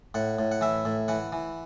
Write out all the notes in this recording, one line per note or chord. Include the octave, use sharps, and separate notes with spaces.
A2 F#5
A2
F#5
E3 E5
A2
E3 F#5
E3